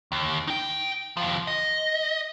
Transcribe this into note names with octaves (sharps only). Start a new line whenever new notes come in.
D#2
D#4 G5
D#2 F3
D#5